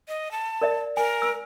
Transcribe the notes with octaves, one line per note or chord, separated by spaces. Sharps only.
D#5
A5
A#4 D5 E5
A#4 G#5
E6